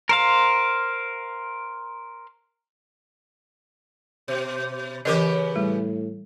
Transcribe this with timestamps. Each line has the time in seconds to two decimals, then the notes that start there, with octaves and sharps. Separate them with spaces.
0.09 A#4 C5 F5
4.28 B2
5.05 C#3 E3 B3 G4 A#4 D#5
5.56 A2 G3